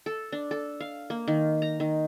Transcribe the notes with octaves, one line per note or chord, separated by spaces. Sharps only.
A4
D4
A4
F5
A#3
D#3
A#5
D#3